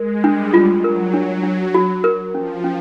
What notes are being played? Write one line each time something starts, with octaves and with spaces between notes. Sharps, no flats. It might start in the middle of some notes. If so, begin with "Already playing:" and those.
Already playing: G#3 A#4
G3 D4
F#3 F4
F#3 A#4
F#3 D4
D4
F#4
A#4
F3 C#4
C#4